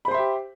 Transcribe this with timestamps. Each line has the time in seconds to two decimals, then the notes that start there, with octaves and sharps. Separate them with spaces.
0.05 B5
0.08 C5
0.11 C6
0.14 E5
0.18 G4